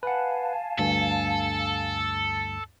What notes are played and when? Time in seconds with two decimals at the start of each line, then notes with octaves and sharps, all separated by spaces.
0.03 B4 F5 F#5 G#5 A5
0.79 D2 G2 A4